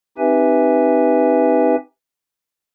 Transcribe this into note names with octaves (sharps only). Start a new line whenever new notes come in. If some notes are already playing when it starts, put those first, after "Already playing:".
C4 D#4 G4 B4 E5 G#5